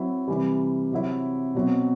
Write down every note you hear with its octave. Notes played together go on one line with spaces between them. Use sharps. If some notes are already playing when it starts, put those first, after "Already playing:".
Already playing: F#3 C4 E4
C3 E3 G3
C3 F#3 C4 E4
B2 F#3 C4